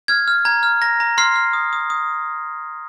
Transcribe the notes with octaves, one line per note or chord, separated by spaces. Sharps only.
F6 G#6
F6
A#5 G#6
F6
A#5 A#6
A#5
C6 F6 C7
F6
D#6
D#6
D#6